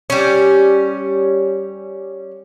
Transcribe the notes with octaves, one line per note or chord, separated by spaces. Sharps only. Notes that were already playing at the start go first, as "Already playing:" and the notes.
G3 C#4